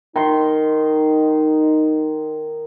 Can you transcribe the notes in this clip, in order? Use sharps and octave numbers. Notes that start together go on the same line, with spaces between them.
D#3 D#4 C6